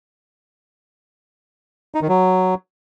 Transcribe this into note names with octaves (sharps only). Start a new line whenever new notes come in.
D#4
D#3
F#3